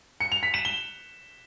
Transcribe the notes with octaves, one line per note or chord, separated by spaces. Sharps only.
C#7
F7
B6
E7
G7